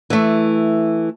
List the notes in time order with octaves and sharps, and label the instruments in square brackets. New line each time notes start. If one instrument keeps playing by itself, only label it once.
[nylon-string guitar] E3 A3